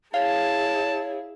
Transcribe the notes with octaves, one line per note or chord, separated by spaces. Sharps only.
E4 G#4 C#5 F5 A5